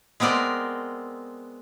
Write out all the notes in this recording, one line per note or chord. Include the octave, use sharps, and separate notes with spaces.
G#3 B3 C4 A#4 D5